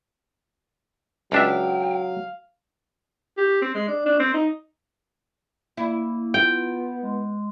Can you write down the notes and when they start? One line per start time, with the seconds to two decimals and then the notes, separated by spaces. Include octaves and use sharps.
1.32 C#2 F#3 D4 E5 F5 G5
3.38 G4
3.62 C4
3.75 G#3
3.88 D4
4.06 D4
4.20 C4
4.34 D#4
5.77 A#3 E4
6.34 B3 F4 G5
7.02 G#3